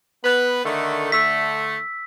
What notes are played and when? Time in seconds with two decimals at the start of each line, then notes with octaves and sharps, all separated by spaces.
0.24 B3 B4
0.65 D3 D#3 A3
1.12 D3 A3 E6 B6